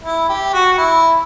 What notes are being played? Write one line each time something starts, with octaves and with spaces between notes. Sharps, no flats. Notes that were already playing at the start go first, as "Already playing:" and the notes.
E4
G4
F#4
F#4
E4